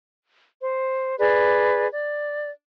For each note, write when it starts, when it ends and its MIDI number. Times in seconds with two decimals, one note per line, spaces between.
0.60 1.16 72
1.19 1.87 68
1.19 1.87 71
1.19 1.87 74
1.90 2.49 74